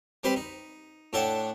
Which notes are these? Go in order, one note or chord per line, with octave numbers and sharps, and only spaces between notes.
G3 C4 G4 B4 B5 C6
D#4
A2 D4 A4 F#5 G5 A5